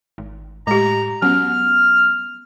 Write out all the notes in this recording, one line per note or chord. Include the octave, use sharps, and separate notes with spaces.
G#1
A2 G#3 G4 A#5
F#3 B3 C#4 F6